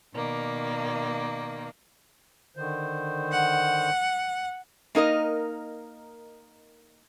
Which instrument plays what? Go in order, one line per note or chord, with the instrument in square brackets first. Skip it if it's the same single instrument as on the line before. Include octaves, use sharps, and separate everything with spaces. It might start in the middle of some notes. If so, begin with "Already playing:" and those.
[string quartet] B2 D#3 A#3 D5
[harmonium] D3 D#3 C5
[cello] F#5
[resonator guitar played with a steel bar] A#3 D#4 A#4 D#5